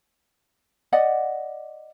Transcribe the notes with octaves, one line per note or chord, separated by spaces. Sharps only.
D5 D#5 F#5